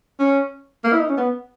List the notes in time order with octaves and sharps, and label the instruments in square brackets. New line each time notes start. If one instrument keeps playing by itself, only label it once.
[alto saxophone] C#4
A#3
E4
D#4
C#4
B3